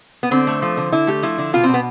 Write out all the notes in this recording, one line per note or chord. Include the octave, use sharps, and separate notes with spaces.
B3
D3 C4
A3
F3
D3
D3 E4
A3 G4
F3 E4
D3
B2 F4
B2 C4
B3